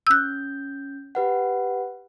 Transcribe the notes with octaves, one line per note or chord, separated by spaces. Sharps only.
C#4 E6 F#6 G6
G4 B4 F#5